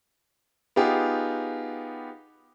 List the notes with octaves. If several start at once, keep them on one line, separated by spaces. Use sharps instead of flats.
B3 D#4 F4 G4 G#4